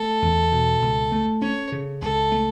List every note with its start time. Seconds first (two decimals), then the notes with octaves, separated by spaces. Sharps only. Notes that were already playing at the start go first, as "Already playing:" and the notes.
Already playing: A3 A4
0.22 E2
0.52 B2
0.82 C#2
1.12 A3
1.42 C#4 C#5
1.72 C#3
2.01 C#2 A4
2.32 A3